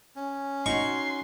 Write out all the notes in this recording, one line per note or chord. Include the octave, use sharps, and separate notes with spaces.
C#4
D#4 F#4 C#5 C6 C#6